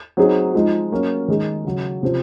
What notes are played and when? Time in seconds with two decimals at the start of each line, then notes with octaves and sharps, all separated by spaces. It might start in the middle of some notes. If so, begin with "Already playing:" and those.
0.17 F#3 C4 D#4 G#4
0.54 F3 G#3 D#4
0.92 F#3 A#3 C#4
1.28 D#3 G#3 D#4 G#4
1.65 C#3 F#3 C#4
2.03 C3 F3 C4